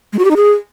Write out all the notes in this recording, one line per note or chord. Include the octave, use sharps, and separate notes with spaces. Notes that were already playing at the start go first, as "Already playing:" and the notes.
G#3
F#4
G4
D#4
G#4